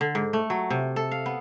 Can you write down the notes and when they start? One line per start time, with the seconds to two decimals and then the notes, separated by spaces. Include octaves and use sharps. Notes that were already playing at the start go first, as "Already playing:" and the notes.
0.01 D3
0.15 G#2
0.33 A3
0.50 F#3
0.70 C3
0.96 A4
1.11 F5
1.26 B3